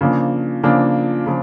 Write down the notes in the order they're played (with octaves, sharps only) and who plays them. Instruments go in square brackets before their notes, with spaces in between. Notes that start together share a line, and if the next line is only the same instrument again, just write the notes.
[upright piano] C#3 F3 A#3 D4
C#3 F3 A#3 D4
C#3 F3